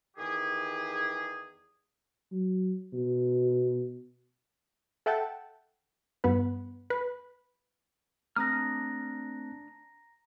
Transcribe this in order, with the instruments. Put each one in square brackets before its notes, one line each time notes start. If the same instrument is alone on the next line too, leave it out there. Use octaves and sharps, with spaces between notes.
[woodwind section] E2 D#3 G4 G#4
[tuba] F#3
B2
[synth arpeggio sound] A4 E5 F#5 G5 A5
G2 B3 B4
B4
[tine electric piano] A3 C4 F#6 [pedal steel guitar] D4 D#6 F6 [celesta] A#5 A#6